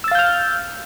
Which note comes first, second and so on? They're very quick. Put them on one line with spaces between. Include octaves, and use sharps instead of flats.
E6 A6 F5 G6 F6